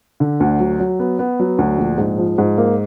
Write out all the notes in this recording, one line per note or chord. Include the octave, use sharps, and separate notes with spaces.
D3
D2
F#3
F#3
B3
B3
F#3
D2
A#1
G#2
F3
G#2
A#3